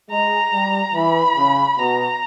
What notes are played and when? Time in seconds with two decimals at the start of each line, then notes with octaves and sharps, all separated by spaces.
0.10 G#3 A#5
0.52 G3
0.94 E3 B5
1.36 C#3
1.78 B2 A#5